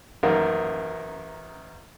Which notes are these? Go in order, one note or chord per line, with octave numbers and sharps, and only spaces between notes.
A1 F#2 D#3 A#3 A#4 F5